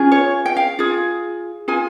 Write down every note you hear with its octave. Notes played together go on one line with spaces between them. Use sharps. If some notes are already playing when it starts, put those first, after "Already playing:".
Already playing: C#4 F4 G#4
C#5
G5
F5
F4 G#4
F4 G#4 G#5